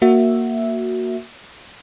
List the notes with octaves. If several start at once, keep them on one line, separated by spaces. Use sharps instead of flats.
A#3 F#4 E5